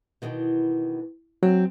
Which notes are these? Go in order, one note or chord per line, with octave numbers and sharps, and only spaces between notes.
B2 D#3 E3
F#3 C4